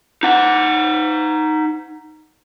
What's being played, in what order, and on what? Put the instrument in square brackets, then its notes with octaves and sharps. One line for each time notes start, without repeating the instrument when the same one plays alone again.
[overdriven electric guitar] D#4 F#5